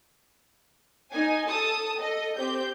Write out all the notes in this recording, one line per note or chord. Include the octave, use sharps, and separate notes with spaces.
D#4 G#5
A4 A5 D#6
A4 D#5
C4 G4 G6